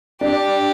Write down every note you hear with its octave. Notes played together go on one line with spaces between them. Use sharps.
D4 G4